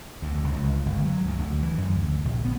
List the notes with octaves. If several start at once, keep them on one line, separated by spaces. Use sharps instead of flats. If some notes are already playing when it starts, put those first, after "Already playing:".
D2
C#2
C#2
G1
F#3
D2
D2
E3
F#2
D2
A#1
B3